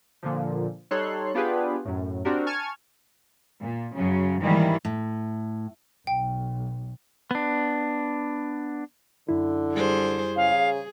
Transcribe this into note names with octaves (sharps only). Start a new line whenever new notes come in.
A#2 D3 F3
G3 D#4 A4 C#5 C6 F#6
B3 D4 F4 G4 G#4 B4
F#2 A2
C4 D4 F#4 G4 A#4
G#5 A5 C#6 F6 G#6
A#2
F#2 C#3 F#3
G#2 D#3 E3 G3 A#3 E4
A2
B1 G5
B3 D4
F#2 D3 E4
G3 G#4 C5
C#3 G#4 F5